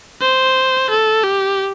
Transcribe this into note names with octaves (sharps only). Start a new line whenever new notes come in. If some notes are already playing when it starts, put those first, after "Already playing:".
C5
A4
G4